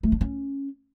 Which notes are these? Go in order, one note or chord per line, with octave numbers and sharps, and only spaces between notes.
A3
D4
C#4